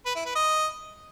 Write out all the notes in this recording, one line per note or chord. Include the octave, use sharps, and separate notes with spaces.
B4
E4
B4
D#5